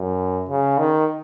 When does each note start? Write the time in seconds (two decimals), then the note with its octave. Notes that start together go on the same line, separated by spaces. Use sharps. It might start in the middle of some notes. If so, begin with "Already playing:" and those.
Already playing: F#2
0.49 C#3
0.78 D#3